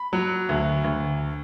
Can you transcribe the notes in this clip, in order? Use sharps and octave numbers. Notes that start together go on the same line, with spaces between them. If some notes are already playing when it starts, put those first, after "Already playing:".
Already playing: B5
F#3
D2
D2